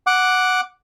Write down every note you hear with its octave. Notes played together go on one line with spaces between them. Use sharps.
F#5 D6